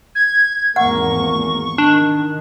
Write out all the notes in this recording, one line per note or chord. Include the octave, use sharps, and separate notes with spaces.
G#6
G#1 E2 A#3 F#5 C#6
D#3 D4